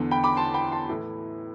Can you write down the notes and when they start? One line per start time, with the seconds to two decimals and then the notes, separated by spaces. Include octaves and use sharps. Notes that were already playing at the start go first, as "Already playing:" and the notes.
Already playing: E2 D3
0.11 G5 B5
0.24 B5 D6
0.37 A5 C6
0.54 G5 B5
0.72 A5 C6
0.89 A2 E3